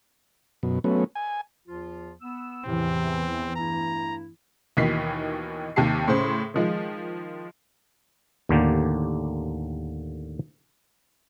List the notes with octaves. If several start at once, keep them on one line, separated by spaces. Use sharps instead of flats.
F#2 B2
F#3 A3 B3 C#4
G#5
E2 F3 F4
B3 E6
E2 A2 C3 E3 C4
G2 A3 E4 A#5
D#2 B2 D#3 E3 B6 C7
D#2 C3 G4 A5 C7
A2 C#3 G#4 C5 C6
D#3 F3 G#3
D#2 A2 D3 A#3 G4